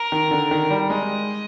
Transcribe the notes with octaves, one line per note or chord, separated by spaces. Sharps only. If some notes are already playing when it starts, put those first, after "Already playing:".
Already playing: A#4
D#3
D3
D#3
G3
G#3 D#5